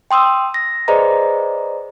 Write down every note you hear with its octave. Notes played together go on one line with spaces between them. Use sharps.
G5 C6 D#6 E6
A#6
G#4 B4 C5 D5 D#5 A#5